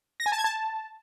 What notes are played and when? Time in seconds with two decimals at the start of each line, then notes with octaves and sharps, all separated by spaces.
0.20 A#6
0.26 G#5
0.32 A5
0.38 G#6
0.44 A5